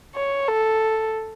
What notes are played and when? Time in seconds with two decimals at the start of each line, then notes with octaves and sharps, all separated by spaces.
0.15 C#5
0.48 A4